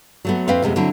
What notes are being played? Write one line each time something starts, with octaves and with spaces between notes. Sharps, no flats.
F#3 A3 B3
F2 C4 B4 E5 F5
F2 C3 G#3 B3
D3 F#3 C4 E4